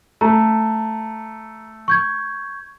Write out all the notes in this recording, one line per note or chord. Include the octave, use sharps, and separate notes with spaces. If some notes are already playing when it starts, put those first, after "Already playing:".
A3 A#5
C#6 G6 G#6